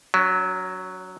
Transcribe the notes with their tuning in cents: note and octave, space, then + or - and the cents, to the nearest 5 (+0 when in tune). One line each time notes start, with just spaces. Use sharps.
F#3 +0 C#4 +45